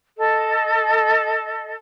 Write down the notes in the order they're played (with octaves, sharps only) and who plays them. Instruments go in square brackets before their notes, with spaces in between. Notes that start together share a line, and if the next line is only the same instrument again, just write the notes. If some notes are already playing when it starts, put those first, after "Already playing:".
[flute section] A4 D#5